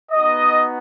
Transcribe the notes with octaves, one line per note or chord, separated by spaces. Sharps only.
B3 D#4 F#4 D#5